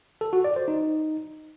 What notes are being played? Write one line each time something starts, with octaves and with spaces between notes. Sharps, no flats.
A4
F#4
D5
C5
D#4